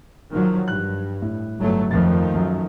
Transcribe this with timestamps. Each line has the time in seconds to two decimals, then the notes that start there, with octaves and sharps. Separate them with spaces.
0.31 D#3 F3 F#3
0.68 G2 F#6
1.22 A2
1.58 G1 F#3 A3
1.91 F2 D#3 F3 A3 A6
2.34 F#2 F#3